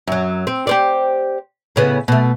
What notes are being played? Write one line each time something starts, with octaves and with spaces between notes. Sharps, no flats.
F#2 F#3
C4
G4 C5 D5
A2 C#3 B3
B2 A3